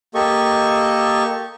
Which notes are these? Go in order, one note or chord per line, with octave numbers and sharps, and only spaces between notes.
A#3 G4 A4 D#5 C#6